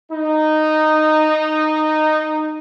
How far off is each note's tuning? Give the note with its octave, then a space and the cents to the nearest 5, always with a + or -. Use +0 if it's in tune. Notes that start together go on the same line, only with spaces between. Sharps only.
D#4 -10